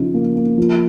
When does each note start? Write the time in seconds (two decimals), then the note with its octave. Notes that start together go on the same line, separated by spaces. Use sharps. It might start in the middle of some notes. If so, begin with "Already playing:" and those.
Already playing: C#3 F3 D#4
0.14 A#3
0.36 A#3
0.58 F3